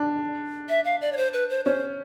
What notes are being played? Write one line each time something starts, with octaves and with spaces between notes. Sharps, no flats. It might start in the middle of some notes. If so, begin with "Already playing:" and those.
Already playing: D4
E5
F5
D5
C#5
C5
B4
C5
C#4 C5